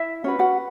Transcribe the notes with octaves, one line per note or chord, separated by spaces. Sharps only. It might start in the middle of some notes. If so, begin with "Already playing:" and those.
Already playing: E4 E5
C#4 F#4 B4 C#5
F#4 F#5